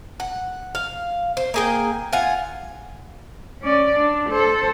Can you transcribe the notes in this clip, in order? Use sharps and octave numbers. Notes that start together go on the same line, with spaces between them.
F#5
F5
C5
A#3 G#4 G5
F4 F#5 G#5
C#4 D5
D4
A4 C5